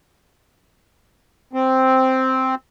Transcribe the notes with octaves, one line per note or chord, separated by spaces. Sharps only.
C4